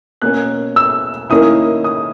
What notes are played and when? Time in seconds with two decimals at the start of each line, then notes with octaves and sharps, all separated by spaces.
0.22 B2 A#3 C#4 F#6
0.76 E6
1.30 D#3 A#3 C#4 E4 D#6
1.84 D#6